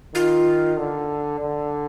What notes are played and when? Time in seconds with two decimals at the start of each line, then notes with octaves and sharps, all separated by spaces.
0.14 D#3 F4
0.77 D3
1.40 D3